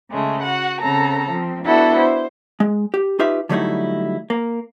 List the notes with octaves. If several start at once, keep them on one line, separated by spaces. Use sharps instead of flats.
C#3 G#3 A3
F#4 F#5
C#3 C4 A4 A#5
F3 C4
B3 D4 E4 F#4 A4 F#5
C5
G#3
G4
D#4 F4 G4 B4 E5
D3 F#3 G3 A3 D#4 E4
A#3